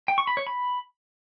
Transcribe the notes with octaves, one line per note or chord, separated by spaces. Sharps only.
G5
C#6
B5
C#5
B5